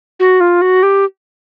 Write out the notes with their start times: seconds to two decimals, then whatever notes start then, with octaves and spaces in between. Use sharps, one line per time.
0.20 F#4
0.41 F4
0.62 F#4
0.83 G4